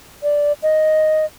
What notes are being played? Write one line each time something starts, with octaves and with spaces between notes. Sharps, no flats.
D5
D#5